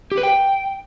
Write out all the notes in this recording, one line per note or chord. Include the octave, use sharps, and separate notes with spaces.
G4
B4
G5